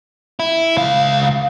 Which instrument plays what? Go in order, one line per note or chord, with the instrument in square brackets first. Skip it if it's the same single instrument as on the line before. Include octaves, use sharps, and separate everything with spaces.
[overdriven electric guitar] E4
C#2 F5